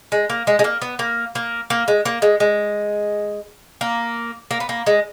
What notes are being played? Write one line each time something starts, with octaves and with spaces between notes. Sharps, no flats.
G#3
A#3
G#3
G#3
A#3
B3
A#3
A#3
A#3
G#3
A#3
G#3
G#3
A#3
A#3
B3
A#3
G#3